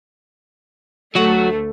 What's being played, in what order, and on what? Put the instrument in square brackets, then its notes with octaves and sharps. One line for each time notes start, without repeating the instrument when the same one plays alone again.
[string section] D2 A3 [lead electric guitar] F#3 F#4